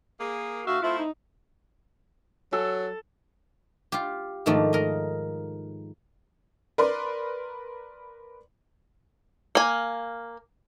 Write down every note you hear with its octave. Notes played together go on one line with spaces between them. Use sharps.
A#3 G#4
D2 F#4 E5 F5
A3 C4 E4 F4
D#4
F#3 A4
F4 G4
G#2 D#3 F3 A3 D#4 D5
A#4 D#5
A#4 B4 D5 C6
A#3 G#5